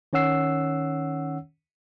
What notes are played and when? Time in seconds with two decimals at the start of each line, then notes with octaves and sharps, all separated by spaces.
0.13 D#3 C#4 C#5 F#5 E6 C7